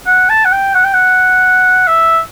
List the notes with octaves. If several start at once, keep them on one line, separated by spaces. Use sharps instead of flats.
F#5
A5
F#5
G5
F#5
G5
F#5
E5